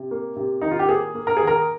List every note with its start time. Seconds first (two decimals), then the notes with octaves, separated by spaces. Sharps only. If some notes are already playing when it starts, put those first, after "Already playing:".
Already playing: C3
0.11 A#3
0.36 C3
0.61 D#3 D#4
0.71 F4
0.79 G4
0.89 A#3 G#4
1.15 A#3
1.27 A#4
1.37 D#3 G#4
1.47 A#4